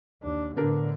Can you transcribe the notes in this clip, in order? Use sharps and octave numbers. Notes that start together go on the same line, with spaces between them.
D#2 D4
A2 D3 B3 D4 A#4